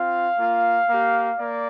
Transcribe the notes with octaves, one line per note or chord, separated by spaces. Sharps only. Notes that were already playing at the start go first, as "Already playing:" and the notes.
Already playing: C4 F4 F5
A#3 F4
A#3 G4
A#3 D5